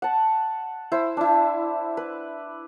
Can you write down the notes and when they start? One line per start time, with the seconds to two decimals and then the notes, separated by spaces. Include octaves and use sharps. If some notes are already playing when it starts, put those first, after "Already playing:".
0.02 F#5 A5
0.92 E4 C5
1.17 D4 E4
1.97 B4